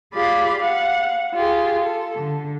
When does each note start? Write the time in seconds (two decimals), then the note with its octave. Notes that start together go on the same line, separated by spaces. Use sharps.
0.14 F4 G4 G#4 D5 F5 B5
0.59 F5 F#5
1.34 F4 G4 G#4
1.83 A4
2.17 D3